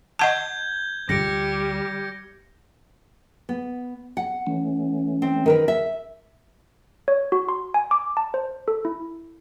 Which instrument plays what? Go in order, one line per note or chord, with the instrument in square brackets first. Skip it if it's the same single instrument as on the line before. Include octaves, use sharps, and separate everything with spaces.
[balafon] D#5 F#5 A5 [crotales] G6 G#6 G7
[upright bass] D2 F4 [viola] G3 [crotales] A#6 C#7 D7
[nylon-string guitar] B3
F#5
[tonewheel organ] E3 A3 C#4
[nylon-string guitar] C4
D#3 A#4 B4
E5
[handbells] C#5
F#4
C6
G#5
D6
A5
C5
A4
E4